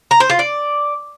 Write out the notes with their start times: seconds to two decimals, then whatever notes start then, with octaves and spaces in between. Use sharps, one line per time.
0.11 A#5
0.20 C5
0.30 F4
0.39 D5